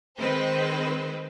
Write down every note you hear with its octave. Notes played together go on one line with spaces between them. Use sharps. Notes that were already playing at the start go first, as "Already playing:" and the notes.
D#3 G#3 C4 B4 C5